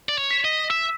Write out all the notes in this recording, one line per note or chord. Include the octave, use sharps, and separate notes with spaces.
D5
C#5
B6 E7
D#5
E5 E6